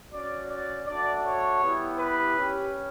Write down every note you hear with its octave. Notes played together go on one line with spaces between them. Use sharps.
C#4 F#4 D5
D5
A3 D4 F#4 D5
C#5
G3 B3 E4 G4
B4
C#4 G4